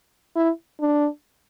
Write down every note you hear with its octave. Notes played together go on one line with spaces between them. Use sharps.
E4
D4